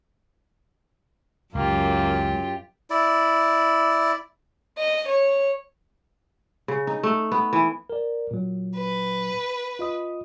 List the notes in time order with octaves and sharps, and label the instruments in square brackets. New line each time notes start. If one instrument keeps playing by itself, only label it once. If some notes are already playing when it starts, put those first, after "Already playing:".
[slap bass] C#2 [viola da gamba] F#2 [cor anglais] A#3 [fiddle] F4 G4
[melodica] E4 D5
[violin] D#5
C#5
[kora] C#3
D#4
A3
B3
E3
[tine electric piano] A#4 D5
A#2 F#3
[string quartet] B4
[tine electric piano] F4 D#5 D#6